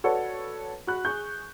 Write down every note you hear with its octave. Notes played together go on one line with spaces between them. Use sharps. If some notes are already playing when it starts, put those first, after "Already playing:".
F#4 A4 B4 C#5 D5 F#5
F#4 B5 F#6
G#4 C#6 G6